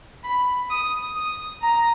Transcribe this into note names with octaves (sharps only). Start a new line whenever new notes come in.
B5
D#6
D#6
A#5